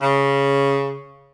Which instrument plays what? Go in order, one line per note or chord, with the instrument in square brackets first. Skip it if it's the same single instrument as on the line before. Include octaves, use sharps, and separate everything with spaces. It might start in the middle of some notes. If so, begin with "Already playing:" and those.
[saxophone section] C#3